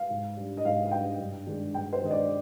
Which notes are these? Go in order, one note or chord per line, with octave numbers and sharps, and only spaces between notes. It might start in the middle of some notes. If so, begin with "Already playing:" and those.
Already playing: F5
G#2
G3 D4
D#5
G#2 F5
F5
G3 D4 G5
G2
D#3 G#3 D4
G2 G5
C5
D#3 G#3 D4 D#5
D5